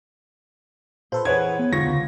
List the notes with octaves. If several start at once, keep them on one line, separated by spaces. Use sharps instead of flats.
A#2 F4 A4 B4 C5
E3 G#4 B4 C#5 F#5 G#6
B3
G#2 B2 D3 F4 C#6 A#6
C#2 D3